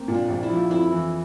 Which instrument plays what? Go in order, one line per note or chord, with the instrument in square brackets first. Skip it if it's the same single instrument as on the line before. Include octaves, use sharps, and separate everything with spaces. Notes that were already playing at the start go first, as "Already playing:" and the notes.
Already playing: [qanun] A#3 C4
[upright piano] A#2
[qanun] D4
[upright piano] A#1
[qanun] E4
[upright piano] F3
[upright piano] F2 [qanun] E4
[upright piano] E3